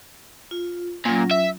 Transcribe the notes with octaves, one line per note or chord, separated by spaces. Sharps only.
F4
A#2 F#3 C#4 F4
E5